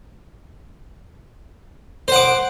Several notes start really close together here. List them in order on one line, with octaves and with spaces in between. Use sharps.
C5 F#5 D6